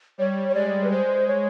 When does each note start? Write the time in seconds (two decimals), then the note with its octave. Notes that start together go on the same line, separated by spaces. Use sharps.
0.18 G3 C#5
0.49 C#5
0.55 G#3 D5
0.84 B4
0.91 G#3 C5
1.27 C#5